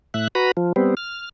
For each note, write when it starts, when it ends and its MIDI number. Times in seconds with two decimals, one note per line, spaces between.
0.14 0.28 45
0.14 0.28 76
0.14 0.28 90
0.35 0.51 66
0.35 0.51 71
0.35 0.51 82
0.35 0.51 83
0.57 0.72 53
0.76 0.95 55
0.76 0.95 59
0.76 0.95 60
0.97 1.29 89